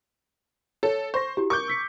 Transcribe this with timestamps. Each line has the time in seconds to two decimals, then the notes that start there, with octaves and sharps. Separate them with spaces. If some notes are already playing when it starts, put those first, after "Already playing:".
0.83 A4 C#5
1.14 C5 C#6 A#6
1.37 E4 F#4 G4
1.50 A#4 C#6 D6 G6
1.68 E6 B6 C#7